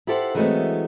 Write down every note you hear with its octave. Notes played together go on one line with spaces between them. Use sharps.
E4 F4 G4 A4 C5 F#5
E3 F#3 G#3 A3 B3 C4